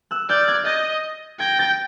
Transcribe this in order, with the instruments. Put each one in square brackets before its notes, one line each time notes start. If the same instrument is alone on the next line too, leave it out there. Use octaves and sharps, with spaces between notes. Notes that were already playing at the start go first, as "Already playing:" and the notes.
[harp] E6 F#6
[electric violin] D5 [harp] F6 G6
[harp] F#6 G#6
[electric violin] D#5 [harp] G6 A6
[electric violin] G5 [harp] G#6 A#6
[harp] G6 A6